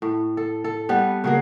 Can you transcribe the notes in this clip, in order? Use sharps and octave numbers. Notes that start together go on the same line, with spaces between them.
A2
A4
A4
G3 B3 B4
C#3 F#3 A#3